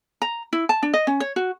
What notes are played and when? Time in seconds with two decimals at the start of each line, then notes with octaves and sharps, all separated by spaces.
0.22 A#5
0.53 E4
0.69 A5
0.83 D4
0.94 D#5
1.07 C#4
1.20 C#5
1.36 F#4